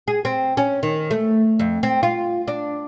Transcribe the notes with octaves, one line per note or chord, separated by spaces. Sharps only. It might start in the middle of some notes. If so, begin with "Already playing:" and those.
G#4
C4
C#4
D#3
A3
F2
C4
F4
D4